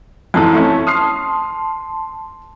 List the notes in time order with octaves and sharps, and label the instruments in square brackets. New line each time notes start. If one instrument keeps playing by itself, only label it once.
[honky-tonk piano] F2 G#2 E3 [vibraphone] C4 A4 A5
[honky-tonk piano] A3 C#4
[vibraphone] A5 C6 [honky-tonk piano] D#6 F6 C7